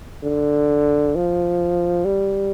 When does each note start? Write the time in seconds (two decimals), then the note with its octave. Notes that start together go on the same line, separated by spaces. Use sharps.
0.24 D3
1.16 F3
2.05 G3